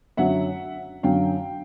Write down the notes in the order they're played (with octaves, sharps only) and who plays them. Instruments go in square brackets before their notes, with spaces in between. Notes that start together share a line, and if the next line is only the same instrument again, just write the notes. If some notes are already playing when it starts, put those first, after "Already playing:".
[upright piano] F#2 D3 F#3 E5 F#5
F#2 D3 F#3 F5 G5